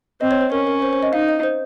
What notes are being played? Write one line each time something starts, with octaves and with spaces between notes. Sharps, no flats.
C4 D#5
C#5
C5
C#4 A#4
A#4
C5
C5
D#5
D#4 F5
D#5
C5